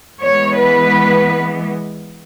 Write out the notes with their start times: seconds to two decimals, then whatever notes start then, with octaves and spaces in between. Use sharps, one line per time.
0.21 E3 G#3 B3 C#5
0.57 B4